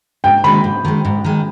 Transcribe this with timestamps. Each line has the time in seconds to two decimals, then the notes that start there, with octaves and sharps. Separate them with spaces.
0.24 G#2 G5
0.44 D#3 G#3 B5
0.64 G#2
0.85 D#3 G#3
1.05 G#2
1.24 D#3 G#3